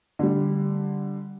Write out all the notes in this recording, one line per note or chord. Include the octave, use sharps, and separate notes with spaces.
D3 G3